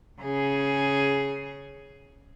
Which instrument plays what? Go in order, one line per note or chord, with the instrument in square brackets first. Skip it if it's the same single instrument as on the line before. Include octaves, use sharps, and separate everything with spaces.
[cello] C#3 G#4